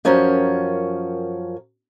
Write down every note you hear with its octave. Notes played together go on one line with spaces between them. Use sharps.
F#2 F3 C#4 A#4 C#5